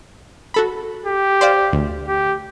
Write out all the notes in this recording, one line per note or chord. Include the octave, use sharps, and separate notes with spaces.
F#4 A4 B5
G4
C5 D5 F5
D2
G4